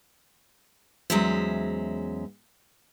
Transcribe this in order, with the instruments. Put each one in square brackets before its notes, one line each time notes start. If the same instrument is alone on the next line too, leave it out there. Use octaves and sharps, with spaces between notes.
[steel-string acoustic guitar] E2 F#3 G#3 C#4 C5 E5